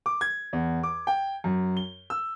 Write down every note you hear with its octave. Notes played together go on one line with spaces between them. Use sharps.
D6
G#6
E2
D6
G5
F#2
G7
E6